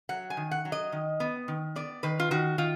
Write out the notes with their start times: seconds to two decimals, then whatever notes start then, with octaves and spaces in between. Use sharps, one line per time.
0.09 F#3 F#5
0.30 G#5
0.37 D#3
0.51 F#5
0.65 F#3
0.72 D#5
0.92 D#3
1.20 B3
1.48 D#3
1.76 B3 D5
2.03 D#3 B4
2.20 F4
2.31 D#3 F#4
2.58 D#3 F4